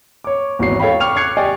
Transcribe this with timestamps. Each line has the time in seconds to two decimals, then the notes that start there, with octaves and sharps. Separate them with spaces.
0.24 C#5 D6
0.59 G#1 E2 F#4 C#5 C7
0.80 A4 C#5 F5 G5 B5
1.00 G5 C#6 D6 F6 F7
1.16 D6 F#6 G#6 C7 C#7
1.37 G4 D5 D#5 G5 G#5 C#6